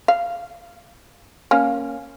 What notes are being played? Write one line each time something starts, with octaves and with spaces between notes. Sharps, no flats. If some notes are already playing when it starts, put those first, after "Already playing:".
F5
A#3 C#4